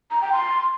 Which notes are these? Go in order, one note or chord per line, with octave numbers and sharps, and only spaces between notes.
A#5
G5
C6